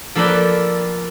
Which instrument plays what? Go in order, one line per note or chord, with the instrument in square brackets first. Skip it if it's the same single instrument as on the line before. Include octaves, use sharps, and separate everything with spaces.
[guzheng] F3 A#3 A4 B4 D5 G5